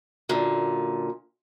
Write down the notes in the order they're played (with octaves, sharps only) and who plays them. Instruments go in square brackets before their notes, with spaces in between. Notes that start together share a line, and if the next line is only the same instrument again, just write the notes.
[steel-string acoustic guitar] F#2 A#2 D3